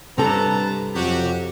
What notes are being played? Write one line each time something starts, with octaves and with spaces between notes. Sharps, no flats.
G2 C3 A4 B4 A5 A#5
F2 F#3 F#4 G4